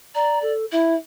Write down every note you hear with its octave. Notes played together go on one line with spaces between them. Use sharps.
D5 A#5
A4
E4 E5